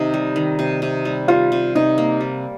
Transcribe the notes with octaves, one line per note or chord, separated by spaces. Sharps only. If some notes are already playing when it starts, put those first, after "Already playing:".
Already playing: C3 D#3 D#4
G3
D#3
C3
C3
G3
G3 F4
C3
C3 D#4
A#3
G3